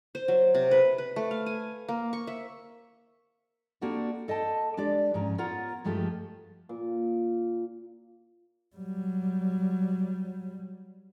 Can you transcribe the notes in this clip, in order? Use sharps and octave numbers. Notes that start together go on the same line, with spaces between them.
C5
F#3
C3
B4
B4
A3
F5
G#5
A#3
C#6
E5
A#3 C4 D4 F#4 G4 A4
A4 D#5 G5 A5
G#3 D4 G4 D5
G#2 F3 C#4 A#5
B3 F4 A#4 C#5 F#5 A#5
G2 F3 G#3 A3 G4
A#2
F#3 G3